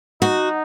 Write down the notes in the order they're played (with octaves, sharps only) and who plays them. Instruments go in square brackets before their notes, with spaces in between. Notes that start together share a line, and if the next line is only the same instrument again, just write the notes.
[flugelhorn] D#4 [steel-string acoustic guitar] F#4